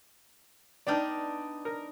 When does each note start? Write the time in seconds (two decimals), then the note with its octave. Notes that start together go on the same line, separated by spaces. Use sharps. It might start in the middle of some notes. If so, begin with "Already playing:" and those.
0.87 B3 D4 D#4 D5 G5 F6
1.65 A#4